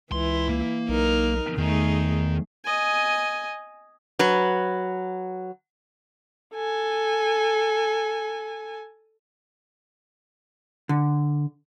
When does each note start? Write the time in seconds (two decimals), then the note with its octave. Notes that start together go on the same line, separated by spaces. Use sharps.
0.12 C#2 E3 E4 C6
0.49 A#3
0.89 B1 D#4 A#4
1.58 E2 D#3 A3 D#4 G#4
2.64 D#5 G#5
4.19 F#3 B4
6.54 A4 G#5
10.89 D3